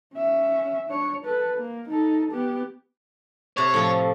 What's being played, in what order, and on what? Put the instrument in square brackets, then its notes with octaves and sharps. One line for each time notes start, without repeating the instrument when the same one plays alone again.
[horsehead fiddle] C#4 E5
D4 C#5
A4 B4
A#3
D#4 A4
B3 G4
[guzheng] C3 C5 A5 [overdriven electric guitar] C#5
[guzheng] A2 F3